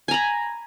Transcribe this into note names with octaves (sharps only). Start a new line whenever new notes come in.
G#5 A#5 B5